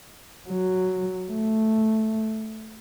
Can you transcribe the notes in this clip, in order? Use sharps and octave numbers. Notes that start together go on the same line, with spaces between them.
F#3
A3